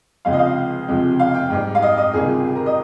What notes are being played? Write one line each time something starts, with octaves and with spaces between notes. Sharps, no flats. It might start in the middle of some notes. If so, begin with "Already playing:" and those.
C#2 C3 F3 G#3 F5
D#5
F5
C#2 C3 F3 G#3
F5
G5
G#2 G3
F5
D#5
D#5
C#2 C3 D#3 G3 G#4
F4
G4
G4
A#4
D#5